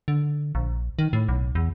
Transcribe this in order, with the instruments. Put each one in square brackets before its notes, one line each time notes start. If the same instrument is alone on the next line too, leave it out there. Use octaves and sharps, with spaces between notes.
[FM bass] D3
A#1
D#3
A2
B1
E2